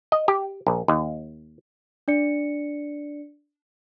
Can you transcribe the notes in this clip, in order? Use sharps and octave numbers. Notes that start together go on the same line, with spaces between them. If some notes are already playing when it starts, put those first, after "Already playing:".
D#5
G4
A#1
D#2
D4 D5 C#7